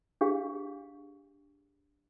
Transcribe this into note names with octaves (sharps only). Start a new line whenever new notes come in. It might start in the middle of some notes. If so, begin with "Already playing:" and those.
D4 G4 G#4 F5